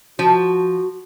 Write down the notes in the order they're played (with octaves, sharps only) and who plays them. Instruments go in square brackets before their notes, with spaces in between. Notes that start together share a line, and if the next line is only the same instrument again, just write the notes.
[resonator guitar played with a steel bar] F3 [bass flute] F#4